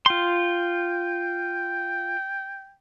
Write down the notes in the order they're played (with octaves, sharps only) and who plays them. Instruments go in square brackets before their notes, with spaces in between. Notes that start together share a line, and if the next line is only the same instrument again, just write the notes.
[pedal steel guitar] F4 C6 [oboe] G5